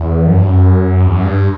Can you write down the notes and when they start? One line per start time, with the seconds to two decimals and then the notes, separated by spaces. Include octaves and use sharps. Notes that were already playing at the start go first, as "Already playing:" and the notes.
Already playing: E2
0.27 F#2
0.37 G2
0.47 F#2
1.06 E2
1.15 F#2
1.24 G2